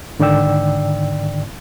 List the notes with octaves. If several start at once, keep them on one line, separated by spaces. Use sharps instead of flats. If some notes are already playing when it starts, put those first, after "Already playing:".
G#2 D3 D#3 D5 G5 E6